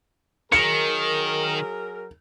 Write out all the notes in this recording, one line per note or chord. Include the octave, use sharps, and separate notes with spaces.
D#3 F#3 G#4 A#4 C#7